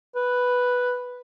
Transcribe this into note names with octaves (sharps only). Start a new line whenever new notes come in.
B4